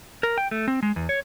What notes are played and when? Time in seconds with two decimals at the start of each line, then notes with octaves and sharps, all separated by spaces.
0.23 A#4
0.38 G5
0.51 A3
0.68 C4
0.83 G#3
0.96 E2
1.09 C#5